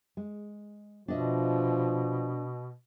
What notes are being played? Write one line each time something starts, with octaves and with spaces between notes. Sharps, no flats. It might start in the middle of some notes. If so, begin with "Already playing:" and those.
G#3
B2 F3 D4 D#5 E5